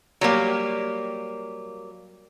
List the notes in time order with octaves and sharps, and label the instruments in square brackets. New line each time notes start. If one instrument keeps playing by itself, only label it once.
[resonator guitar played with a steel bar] F#3 G3 A#3